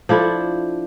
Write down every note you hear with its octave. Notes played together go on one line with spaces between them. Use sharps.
F3 D4 E4 A4